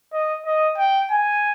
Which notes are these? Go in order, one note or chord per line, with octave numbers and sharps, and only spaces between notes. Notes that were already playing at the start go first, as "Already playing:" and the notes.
D#5
D#5
G5
G#5